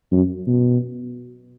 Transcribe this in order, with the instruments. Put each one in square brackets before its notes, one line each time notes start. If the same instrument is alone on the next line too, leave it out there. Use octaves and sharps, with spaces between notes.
[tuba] F#2
B2